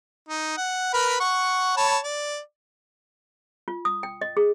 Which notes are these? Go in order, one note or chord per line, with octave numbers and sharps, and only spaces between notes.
D#4
F#5
A#4 B4 B5
F#5 C#6
C#5 A5 B5
D5
F4
D#6
G5
D#5
G#4